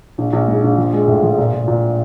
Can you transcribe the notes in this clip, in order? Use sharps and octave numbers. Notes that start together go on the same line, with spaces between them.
A#1
A#1
G#2
A#1
F3
G#3
A2
F3
A#2
A#2
A#2